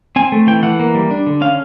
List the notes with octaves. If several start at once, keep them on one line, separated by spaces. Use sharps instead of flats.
C4 G#5
A3
E3 G5
E3 F#5
A#3
G3
D4
D3
C#4 F5